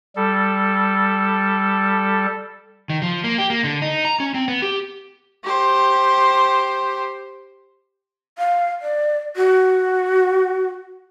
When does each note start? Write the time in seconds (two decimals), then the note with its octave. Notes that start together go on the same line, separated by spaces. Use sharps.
0.16 G3 A4
2.90 D#3
3.02 F3
3.24 A#3
3.38 G4
3.50 A#3
3.64 D3
3.82 D#4
4.05 A#5
4.20 C#4
4.34 C4
4.48 B3
4.62 G4
5.44 G4 C5
8.38 F5
8.82 D5
9.36 F#4